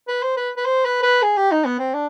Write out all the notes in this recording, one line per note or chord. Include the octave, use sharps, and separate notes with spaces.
B4
C5
B4
B4
C5
B4
B4
G#4
G4
D#4
B3
C4
D4